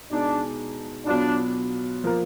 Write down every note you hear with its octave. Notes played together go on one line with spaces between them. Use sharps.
B2 G#3 D4 D#4 G#4
B2 F#3 B3 D4 F4
F3 A#3 F4 A#4